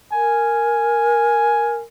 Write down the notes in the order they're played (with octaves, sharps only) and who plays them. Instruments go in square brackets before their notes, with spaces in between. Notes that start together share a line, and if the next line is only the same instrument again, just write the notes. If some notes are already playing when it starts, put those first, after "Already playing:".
[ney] A#4 [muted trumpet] G#5